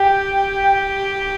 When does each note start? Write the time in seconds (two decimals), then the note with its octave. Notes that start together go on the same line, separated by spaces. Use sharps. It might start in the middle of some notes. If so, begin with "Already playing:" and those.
Already playing: G4 G5